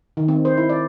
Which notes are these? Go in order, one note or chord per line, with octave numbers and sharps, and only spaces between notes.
D#3
C4
C5
E4
D5